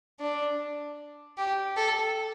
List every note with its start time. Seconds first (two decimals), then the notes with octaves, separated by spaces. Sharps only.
0.20 D4
1.37 G4
1.76 A4